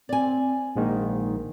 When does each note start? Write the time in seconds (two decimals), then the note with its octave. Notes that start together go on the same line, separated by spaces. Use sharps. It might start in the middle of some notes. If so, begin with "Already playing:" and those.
0.09 C4 D5 G#5
0.76 A#1 G#2 D#3 A#3